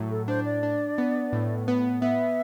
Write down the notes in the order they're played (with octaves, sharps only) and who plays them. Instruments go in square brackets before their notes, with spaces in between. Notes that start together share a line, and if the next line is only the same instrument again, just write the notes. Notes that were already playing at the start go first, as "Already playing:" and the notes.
Already playing: [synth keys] A2 F#3
[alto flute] A4
[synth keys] D4 [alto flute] C5
[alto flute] D5
[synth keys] D4
B3
A2
B3
[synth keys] B3 [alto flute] E5